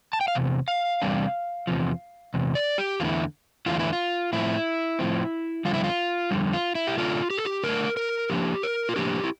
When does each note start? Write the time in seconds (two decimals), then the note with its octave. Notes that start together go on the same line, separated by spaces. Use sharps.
0.13 A5
0.21 G5
0.28 F5
0.35 E2 C3
0.68 F5
1.02 E2 C3 G3 D4
1.67 E2 C3 F3
2.34 E2 C3
2.55 D5
2.78 G4
3.00 E2 D3 A3 E4 F4
3.66 E2 D3 A3 E4 F4
3.79 E4
3.93 F4
4.33 A2 F3 C4 E4
4.99 A2 F3 C4
5.65 F2 D3 G3 F4
5.74 E4
5.84 F4
6.31 F2 D3 G3
6.53 F4
6.75 E4
6.87 G4
6.98 D3 A3 D4 F4
7.30 G4
7.38 A4
7.45 G4
7.64 D3 A3 D4 A#4
7.97 A#4
8.30 A2 F3 A#3 D4 G4
8.63 A#4
8.89 F4
8.96 A2 F3 A#3 D4 G4
9.24 E4